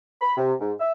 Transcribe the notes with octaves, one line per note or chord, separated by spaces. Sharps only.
B5
C3
G#2
E5